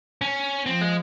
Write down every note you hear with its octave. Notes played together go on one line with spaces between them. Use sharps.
C#4
F3 C4
G#3